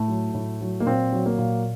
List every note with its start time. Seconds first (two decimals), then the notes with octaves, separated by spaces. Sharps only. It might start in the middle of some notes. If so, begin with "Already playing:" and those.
Already playing: A2 A3
0.08 F#3
0.34 A2
0.61 F#3
0.80 A#3
0.86 A#2 C4
1.13 F#3
1.26 A#3
1.38 A#2